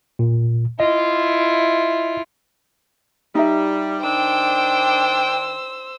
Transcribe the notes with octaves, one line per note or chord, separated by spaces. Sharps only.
A#2
E4 F4 D#5
G3 D#4 E5
D#3 D4 C5 G5 E6